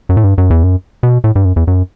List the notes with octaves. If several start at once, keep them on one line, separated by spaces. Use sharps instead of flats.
F#2
A2
G2
F#2
E2
F#2
B2
A2
G2
F#2
E2
F#2